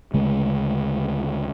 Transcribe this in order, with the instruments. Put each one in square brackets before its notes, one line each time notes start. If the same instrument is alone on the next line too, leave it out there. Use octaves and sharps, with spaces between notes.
[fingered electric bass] D2 C#3 G#3